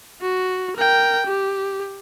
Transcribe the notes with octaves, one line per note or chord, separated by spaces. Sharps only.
F#4
A#4 G5
G4